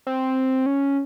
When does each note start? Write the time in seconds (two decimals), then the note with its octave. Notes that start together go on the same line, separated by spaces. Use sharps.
0.07 C4
0.66 C#4